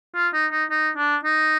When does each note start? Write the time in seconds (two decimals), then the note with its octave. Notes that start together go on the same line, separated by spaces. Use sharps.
0.15 F4
0.34 D#4
0.52 D#4
0.71 D#4
0.97 D4
1.25 D#4